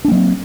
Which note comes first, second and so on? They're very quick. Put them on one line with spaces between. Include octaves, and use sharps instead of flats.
D4 A#3 F#3 C4